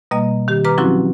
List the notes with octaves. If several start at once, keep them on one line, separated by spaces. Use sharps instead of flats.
B2 G3 A#3 D#5
D#3 G4
B4 A#5 D6 F6
F3 F#3 C4 C#4 E4 F#4